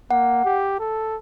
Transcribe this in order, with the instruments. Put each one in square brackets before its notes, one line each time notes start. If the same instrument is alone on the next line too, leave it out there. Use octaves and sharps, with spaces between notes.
[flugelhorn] A#3 [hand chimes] F#5
[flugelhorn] G4
A4